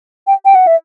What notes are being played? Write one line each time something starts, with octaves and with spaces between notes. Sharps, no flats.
G5
G5
F#5
E5